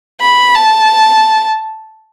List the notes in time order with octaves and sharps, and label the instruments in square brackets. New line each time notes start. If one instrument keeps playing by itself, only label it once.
[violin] B5
A5